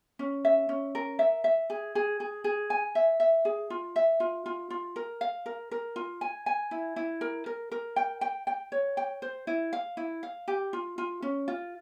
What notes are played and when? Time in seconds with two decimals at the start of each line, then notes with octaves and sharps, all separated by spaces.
0.19 C#4
0.45 E5
0.69 C#4
0.95 A#4
1.19 E5
1.44 E5
1.70 G#4
1.95 G#4
2.20 G#4
2.44 G#4
2.70 G#5
2.95 E5
3.20 E5
3.45 G#4
3.70 F4
3.96 E5
4.20 F4
4.46 F4
4.70 F4
4.96 A#4
5.21 F5
5.46 A#4
5.71 A#4
5.96 F4
6.21 G#5
6.46 G#5
6.71 E4
6.96 E4
7.21 A#4
7.46 A#4
7.72 A#4
7.96 G5
8.21 G5
8.47 G5
8.72 C#5
8.97 G5
9.22 C5
9.47 E4
9.73 F5
9.97 E4
10.23 F5
10.48 G4
10.73 F4
10.98 F4
11.22 C#4
11.48 F4